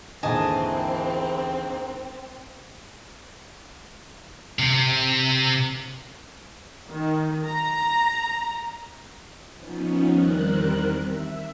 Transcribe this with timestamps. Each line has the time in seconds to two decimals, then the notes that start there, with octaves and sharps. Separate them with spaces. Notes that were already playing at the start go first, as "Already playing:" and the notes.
0.23 D#2 G#2 D3 E3 C4 D#5 G#5 A5
4.59 C3
6.90 D#3
7.45 A#5
9.56 F3 B3 C#4 D#4
10.11 E2 D#3 G3 C4 A#4 F#6
11.04 E5